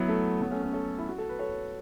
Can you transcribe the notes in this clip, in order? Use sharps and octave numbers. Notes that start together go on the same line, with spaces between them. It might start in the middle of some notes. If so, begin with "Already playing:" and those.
Already playing: F#3 B3 E4
A3
F#3 B3
A3 C#4
A3 C#4
A4 C#5
E4
F#4
A4
B4
A4 C#5